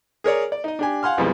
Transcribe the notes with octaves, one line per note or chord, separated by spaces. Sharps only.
G#4 A#4 C#5 D5
D5
D#4 D#5
D4 G4 G#5
F5 F#5 G#5 C6 F6
B1 F2 E3 F3 G3 G#3